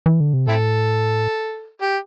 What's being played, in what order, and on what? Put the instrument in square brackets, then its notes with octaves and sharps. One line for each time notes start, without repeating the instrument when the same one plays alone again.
[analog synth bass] E3
D3
C3
[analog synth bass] A2 [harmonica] C4 E4 A4
[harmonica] G4